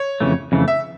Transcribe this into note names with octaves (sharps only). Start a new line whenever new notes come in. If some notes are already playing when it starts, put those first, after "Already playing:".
Already playing: C#5
F2 C#3 E3 A3
F2 C#3 E3 A3
E5